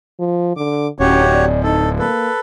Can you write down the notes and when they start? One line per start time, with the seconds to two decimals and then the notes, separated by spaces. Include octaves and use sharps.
0.20 F3
0.57 D3 D6
1.00 D1 C#4 F#4 G4 C#5
1.34 D5
1.64 D#4 A4
1.99 A#3 A4 B4